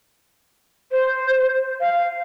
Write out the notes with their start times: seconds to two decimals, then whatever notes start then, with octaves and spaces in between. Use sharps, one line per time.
0.92 C5
1.81 F5